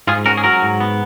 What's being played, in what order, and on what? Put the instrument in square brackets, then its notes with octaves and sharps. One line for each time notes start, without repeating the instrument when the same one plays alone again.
[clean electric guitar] G#2 F4 G#4
C#4 F#4 A#4
G#4
F#3 F#4 A#4
G#2
B3